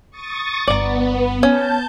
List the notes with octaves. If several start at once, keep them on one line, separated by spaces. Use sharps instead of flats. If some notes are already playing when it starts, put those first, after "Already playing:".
C#6 D#6 A6
G1 G2 B3 D5 A#5
C#4 A5 G6